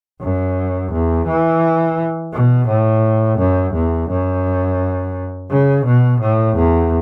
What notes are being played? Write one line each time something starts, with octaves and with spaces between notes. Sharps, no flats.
F#2
E2
E3
B2
A2
F#2
E2
F#2
C#3
B2
A2
E2